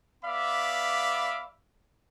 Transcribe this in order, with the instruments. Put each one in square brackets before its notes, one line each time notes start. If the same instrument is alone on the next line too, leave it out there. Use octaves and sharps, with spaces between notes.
[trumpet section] B3 D5 E5 F5 B5 D6